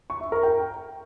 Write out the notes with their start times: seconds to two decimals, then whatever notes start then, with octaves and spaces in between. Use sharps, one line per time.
0.10 C#6
0.21 E5
0.32 A#4
0.43 G5